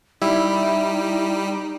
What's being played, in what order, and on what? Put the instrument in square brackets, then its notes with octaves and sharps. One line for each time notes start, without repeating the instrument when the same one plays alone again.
[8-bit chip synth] G3 [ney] D#4 [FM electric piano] E4